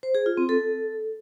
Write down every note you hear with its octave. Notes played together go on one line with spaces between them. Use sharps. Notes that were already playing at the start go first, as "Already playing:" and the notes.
C5
G#4
F4
C4
A4